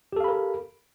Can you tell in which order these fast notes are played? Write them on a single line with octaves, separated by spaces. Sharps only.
G4 A4 F5 B5 A#4